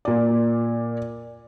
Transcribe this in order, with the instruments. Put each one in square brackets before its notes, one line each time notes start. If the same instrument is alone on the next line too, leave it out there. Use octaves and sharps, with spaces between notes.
[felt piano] A#2 D5